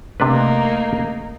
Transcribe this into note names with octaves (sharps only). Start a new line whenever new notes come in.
C3 A3 A#3 D4 D#4 B4